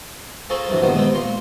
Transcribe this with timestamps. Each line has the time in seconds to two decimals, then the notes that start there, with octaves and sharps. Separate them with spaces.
0.50 F4 G#4 A4 C5 A#5 C#6
0.69 G2 C3 E3 F#3
0.82 C2 G2 A#2 D#3 B3 C5
0.94 G#3 B3 C4
1.14 A#2 A#5 C6 C#6